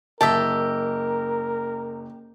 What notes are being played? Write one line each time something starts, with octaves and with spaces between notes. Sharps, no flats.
F#1 G4 A#4 D#5 E5 A5